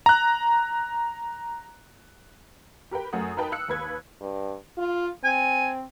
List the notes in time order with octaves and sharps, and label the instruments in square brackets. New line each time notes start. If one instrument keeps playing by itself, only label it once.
[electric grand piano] A#5 F#6
[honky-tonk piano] G4 A#4 B4 G5
F#2 A3 A#4 F#5 D#6
D#4 A#4 B4 G5 A5
E6 F#6 C#7
D#2 B4 G#6
[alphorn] G2
F4
[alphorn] C4 [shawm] G#5